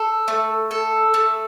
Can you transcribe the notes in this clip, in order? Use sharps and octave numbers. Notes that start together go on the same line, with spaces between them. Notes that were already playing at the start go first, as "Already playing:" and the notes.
Already playing: A4
A3
A4
A3